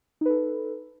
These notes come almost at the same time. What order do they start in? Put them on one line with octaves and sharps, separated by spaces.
D#4 B4 A4